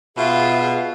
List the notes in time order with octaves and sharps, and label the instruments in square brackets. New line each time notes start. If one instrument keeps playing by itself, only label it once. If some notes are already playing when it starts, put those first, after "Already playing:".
[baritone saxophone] B2 [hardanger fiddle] F4 [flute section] G#4 E5